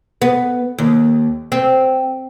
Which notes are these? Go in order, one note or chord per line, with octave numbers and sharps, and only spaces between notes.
B3
D#2
C4